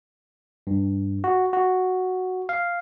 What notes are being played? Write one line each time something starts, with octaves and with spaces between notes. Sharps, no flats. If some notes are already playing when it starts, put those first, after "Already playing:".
G2
F#4
F#4
F5